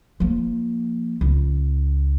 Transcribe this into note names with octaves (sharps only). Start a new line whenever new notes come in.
F3 A#3
C#2